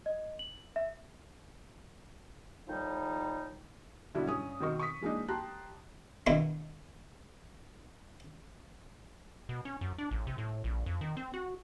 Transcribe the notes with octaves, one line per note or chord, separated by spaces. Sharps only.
D#5
F#7
E5
D#2 A2 F3 G3 D#4
B2 D3 G3 D4 E4
G2 C#4 D#6
B2 D#3 C4 A#4 D#5 C#6
C#6 D#6 B6
E3 G#3 A#3 D4 D#4
G4 G5 A5 A#5 C6 F#6
G2 B2 D#3 G3 D#4 E4
B2
C#4
F#2
D4
A1
C3
A2
A#1
F2
D#3
C4
F#4